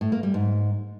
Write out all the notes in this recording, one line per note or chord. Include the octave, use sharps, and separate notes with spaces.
A2
A#3
G3
G#2